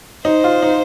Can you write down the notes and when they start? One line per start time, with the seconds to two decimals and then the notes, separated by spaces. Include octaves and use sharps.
0.25 D#4 C5
0.44 F4
0.63 D#4